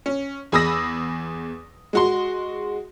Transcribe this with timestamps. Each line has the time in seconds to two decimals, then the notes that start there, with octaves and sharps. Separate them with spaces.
0.06 C#4
0.52 E2 G#4 B5 D#6 E6 A#6
1.93 G#3 F#4 C6